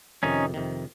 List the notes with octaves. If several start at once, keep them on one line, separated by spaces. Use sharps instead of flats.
F2 C3 D#3 C#4 D#4
F2 C3 D#3